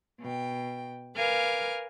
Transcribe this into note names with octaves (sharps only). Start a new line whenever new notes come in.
B2 G5
A#4 B4 F5 G#5 D6 F6